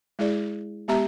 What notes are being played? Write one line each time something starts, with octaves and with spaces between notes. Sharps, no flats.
G#3 E4 G#4 D5
G#3 B3 G4 E5 A#5